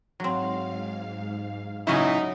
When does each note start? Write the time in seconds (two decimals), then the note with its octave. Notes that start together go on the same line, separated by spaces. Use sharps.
0.20 G#2 F#3 C4 F5
1.87 A#2 C#3 F#3 C#4 D#4 E4 G#5